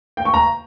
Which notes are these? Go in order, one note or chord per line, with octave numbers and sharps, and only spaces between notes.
G5
C#6
A#5